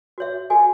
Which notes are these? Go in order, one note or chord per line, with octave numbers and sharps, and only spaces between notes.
F#4 C#5 E5
F#4 A4 D#5 G#5